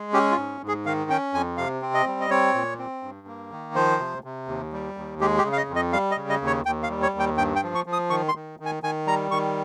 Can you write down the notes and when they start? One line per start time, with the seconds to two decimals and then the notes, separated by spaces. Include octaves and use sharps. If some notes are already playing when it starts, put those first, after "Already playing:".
Already playing: G#3
0.13 C#4 G4
0.32 F4
0.37 G#2
0.61 G#2
0.68 G#4
0.86 D#3 F5
1.10 C#4 G5
1.33 F2 G#5
1.57 C3 F5
1.82 C4
1.94 D#5
2.07 G3
2.21 D#5
2.30 C4 C#5
2.54 A#2
2.78 C4
3.03 G2
3.27 A#3
3.51 D#3
3.75 F3 C5
3.99 C3
4.24 C3
4.48 D#2
4.73 G3
4.97 D#2
5.21 G#3 G4
5.38 G4
5.45 C#3
5.53 F5
5.57 D#5
5.68 F2
5.76 D#5
5.92 G3 F5
6.11 D#5
6.17 C#3
6.29 D#5
6.41 D#2
6.47 C#5
6.66 D#2 G5
6.83 F5
6.90 G3
7.02 C#5
7.14 D#2
7.20 G5
7.38 G2 G5
7.56 G5
7.63 F3
7.75 C#6
7.86 F3
7.92 D#6
8.10 D#3 C#6
8.28 C6
8.35 D#3
8.60 D#3
8.66 G#5
8.83 D#3 G#5
9.07 G3 A#5
9.31 D#3 C#6